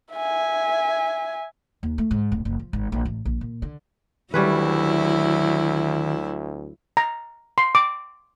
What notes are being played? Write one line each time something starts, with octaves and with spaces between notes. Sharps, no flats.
E5 G#5
D#2
A3
G#2
D1
F#1
F3
G#1
A#1
A1
A#1
A#2
D3
D2 D#3 F#3 G3 C#4 E4 B4
A#5
C6
D6